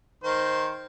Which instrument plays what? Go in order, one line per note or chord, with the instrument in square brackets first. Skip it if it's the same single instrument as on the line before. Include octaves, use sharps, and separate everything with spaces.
[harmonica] D#3 C5